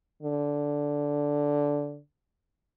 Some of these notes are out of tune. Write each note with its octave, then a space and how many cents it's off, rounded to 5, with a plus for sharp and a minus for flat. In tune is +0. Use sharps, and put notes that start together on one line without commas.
D3 -10